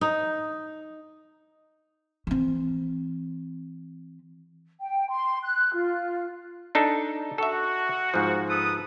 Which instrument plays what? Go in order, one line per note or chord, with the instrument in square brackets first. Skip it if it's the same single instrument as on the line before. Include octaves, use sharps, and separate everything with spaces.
[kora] D#4
[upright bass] E3 C4
[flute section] G5
C6
F#6
F4
[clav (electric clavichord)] D4 D#4 A4
[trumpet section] F#4 [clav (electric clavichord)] A4 E5
[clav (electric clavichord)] G#2 F3
[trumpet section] A4 B4 D#6